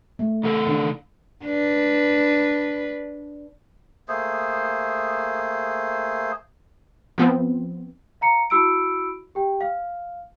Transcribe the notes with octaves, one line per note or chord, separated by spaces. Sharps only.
A3
C#3 A4
D#3 D4
D4 B4
A3 A#3 G#4 C5
F3 B3 C4
F5 A#5 C#7
E4 F#4 B5 E6 C#7 D7
G4 G5
F5